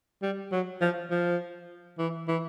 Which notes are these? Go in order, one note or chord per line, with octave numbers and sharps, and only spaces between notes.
G3
F#3
F3
F3
E3
E3